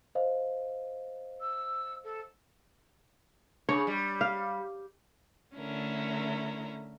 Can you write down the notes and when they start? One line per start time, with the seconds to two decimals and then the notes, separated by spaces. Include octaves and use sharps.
0.15 C5 D#5 F5
1.41 E6
2.04 A4
3.69 C#3 D4 C#5 D6
3.87 G3
4.21 F5
5.55 D3 A3 C#4 E4 A#4